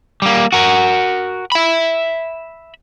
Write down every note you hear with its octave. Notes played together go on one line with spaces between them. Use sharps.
G3 A#3
F#4 A#4
E5 B5